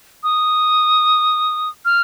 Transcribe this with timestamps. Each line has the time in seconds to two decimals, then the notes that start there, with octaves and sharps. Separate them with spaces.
0.23 D#6
1.85 F6